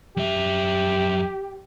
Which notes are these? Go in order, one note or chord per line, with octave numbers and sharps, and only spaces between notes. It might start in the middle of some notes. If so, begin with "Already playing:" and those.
F#2 G4 E5